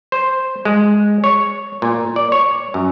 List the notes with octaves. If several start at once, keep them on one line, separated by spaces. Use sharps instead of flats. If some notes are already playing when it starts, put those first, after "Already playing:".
C5
G#3
C#5
A#2
D5
C#5
F#2